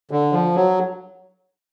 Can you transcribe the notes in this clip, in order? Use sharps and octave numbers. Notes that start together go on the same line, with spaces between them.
D3
F3
F#3